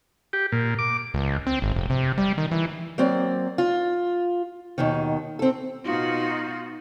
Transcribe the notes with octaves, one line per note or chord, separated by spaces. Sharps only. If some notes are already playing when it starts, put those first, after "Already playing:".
G4
A#2
D6
C#2
C4
G#1
F1
C3
G3
D#3
E3
F#3 A#3 C4 D5
F4
D#2 B2 D#3
C4 A4
B2 B3 D#4 F4 F#4 C6